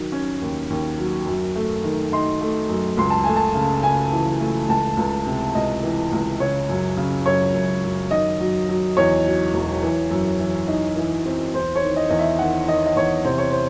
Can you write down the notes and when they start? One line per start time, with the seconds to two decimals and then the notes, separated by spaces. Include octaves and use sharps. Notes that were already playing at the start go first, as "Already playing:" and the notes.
Already playing: D#3 F#3
0.12 C#4
0.41 D#2
0.70 D#2
0.98 F#3
1.26 F#2
1.55 A3
1.84 D#3
2.12 D#4 C6
2.41 A3
2.69 F#2
2.97 C#2 C6
3.10 A5
3.24 A3 G#5
3.36 A5
3.55 C#3
3.83 C#3 G#5
4.12 E3
4.40 A3
4.69 C#2 A5
4.97 C#2
5.27 C3
5.55 C#2 D#5
5.83 E3
6.12 C#2
6.40 C#3 C#5
6.69 F#2
6.97 C#3
7.26 F#2 C#5
7.54 F#2
7.83 F#2
8.11 D#3 D#5
8.40 F#3
8.68 F#3
8.97 E2 C#5
9.25 F#3
9.54 E1
9.83 E3
10.11 F#2
10.39 E3
10.68 D#4
10.96 E3
11.25 C4
11.54 E2 C5
11.76 C#5
11.83 D#3
11.96 D#5
12.10 E2 D#5
12.19 E5
12.39 D#3 F#5
12.67 D#3 D#5
12.86 D#5
12.96 E2 C#5
13.25 C3 C5
13.38 C#5
13.51 C5